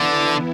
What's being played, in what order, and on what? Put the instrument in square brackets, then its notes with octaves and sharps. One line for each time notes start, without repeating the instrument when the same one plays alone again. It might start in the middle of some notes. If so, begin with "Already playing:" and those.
Already playing: [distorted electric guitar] D3 [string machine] E3 B3 E4